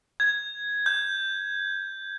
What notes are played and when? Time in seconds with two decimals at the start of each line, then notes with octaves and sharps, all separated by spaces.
0.20 G#6
0.86 G6